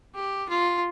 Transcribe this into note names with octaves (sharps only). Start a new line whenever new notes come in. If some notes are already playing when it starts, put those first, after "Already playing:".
G4
F4